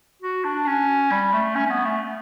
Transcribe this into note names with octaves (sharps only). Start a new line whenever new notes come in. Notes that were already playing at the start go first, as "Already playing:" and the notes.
F#4
D4
C#4
G3
A3
C#4
C#4
B3
A3